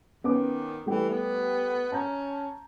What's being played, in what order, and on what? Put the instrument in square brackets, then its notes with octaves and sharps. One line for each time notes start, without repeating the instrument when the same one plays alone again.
[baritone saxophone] D#3 [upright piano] B3 C#4 D6
[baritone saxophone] E3 [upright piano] G3 A3 G4
[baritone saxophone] B3
[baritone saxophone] C#4 [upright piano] A5 A#5 G6